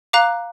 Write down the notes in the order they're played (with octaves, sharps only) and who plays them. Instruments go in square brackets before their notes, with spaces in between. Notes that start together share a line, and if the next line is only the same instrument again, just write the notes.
[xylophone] F5 A#5 D6 F#6